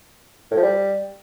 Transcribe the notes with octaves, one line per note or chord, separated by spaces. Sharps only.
A2
F3
G3